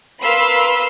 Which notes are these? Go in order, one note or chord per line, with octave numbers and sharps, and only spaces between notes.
A#4 B4 F5 B5 C6 E6